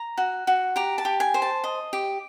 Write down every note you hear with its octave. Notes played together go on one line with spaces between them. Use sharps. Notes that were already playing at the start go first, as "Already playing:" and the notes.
Already playing: A#5
F#4
F#4
G4 A#5
A5
G4
G#5
C5
A5
D#5
G4